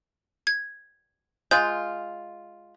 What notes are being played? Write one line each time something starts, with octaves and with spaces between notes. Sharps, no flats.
G#6
G#3 F4 G6